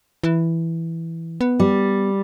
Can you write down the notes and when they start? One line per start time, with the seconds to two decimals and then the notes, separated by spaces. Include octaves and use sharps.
0.24 E3
1.41 B3
1.60 G3